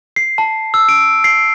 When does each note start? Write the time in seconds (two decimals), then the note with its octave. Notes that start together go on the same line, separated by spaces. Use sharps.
0.16 C7
0.38 A5
0.74 E6
0.89 D7
1.24 C7